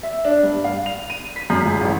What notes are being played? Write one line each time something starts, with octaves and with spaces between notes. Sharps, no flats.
E5
D4
G2
F5
F7
D#7
B6
F#2
C#2
A1